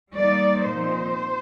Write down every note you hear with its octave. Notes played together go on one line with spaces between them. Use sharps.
G3 A#3 D#4 D5
A#2 F3 C4 D#4 C5